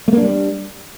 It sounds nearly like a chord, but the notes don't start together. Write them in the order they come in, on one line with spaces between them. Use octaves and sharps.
A3 A#3 D4 G3